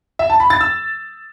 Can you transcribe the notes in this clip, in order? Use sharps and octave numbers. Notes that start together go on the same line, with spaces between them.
E5
A5
B5
A6
E6